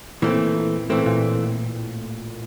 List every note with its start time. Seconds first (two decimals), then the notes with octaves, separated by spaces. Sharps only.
0.22 A#2 E3 A3 C4
0.90 A2 E3 A3 C4
1.06 A#2